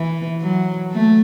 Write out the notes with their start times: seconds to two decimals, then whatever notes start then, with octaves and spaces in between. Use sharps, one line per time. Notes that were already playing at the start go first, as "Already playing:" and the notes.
Already playing: E3
0.41 F#3
0.92 A3